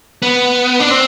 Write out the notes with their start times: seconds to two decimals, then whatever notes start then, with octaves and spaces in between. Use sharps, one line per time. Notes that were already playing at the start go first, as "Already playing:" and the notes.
0.22 B3
0.80 D4
0.91 C4